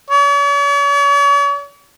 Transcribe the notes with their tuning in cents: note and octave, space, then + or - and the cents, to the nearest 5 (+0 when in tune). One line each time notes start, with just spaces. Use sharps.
C#5 +45